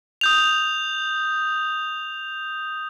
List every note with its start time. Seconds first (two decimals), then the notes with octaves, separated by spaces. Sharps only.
0.21 D#6 G6 F7